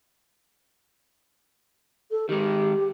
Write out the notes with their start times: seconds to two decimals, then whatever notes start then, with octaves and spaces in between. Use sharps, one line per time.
2.11 A4
2.29 D#3 G#3 G4